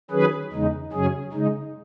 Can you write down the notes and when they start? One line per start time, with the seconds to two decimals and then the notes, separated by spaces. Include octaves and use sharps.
0.11 D#3 F#3 C#4 G#4 B4
0.52 E2 C#3 G#3 D#4
0.93 F#2 C#3 F#3 C#4 G#4
1.33 C#3 G#3 D#4